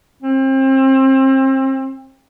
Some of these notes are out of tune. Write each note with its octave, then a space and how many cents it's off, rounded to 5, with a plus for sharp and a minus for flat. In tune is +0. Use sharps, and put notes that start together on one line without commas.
C4 +30